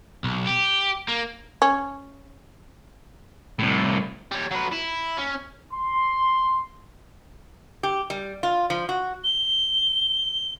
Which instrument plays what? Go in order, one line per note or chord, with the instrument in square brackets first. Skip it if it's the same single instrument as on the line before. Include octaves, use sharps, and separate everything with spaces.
[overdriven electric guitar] B1
G4
A#3
[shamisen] C#4
[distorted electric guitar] C2 A2
[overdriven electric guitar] G3 C#5
F#3 B4
E4
C#4
[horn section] C6
[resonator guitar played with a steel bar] G4
G3
F4
F3
F#4
[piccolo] G7